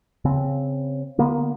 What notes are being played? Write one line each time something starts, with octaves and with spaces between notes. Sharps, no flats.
C#3 C4
D3 A#3 B3